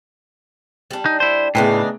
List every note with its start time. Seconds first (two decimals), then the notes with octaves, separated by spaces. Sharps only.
0.91 G3 D4
1.06 D#4
1.20 E4 C5
1.55 A2 C#3 A3 B3 D4 D#4 G5